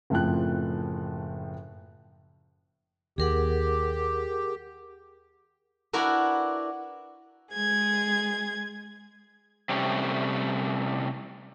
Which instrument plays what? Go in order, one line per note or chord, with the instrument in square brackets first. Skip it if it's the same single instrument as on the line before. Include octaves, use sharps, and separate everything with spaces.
[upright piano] F#1 A2 F3 C4 G5 F#6
[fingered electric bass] D#2 [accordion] G4 [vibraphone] G#4 A#4 F#5
[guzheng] D4 E4 F#4 A#4 B4
[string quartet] G#3 G#4 G#6
[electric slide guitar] C3 G3 A3 C#4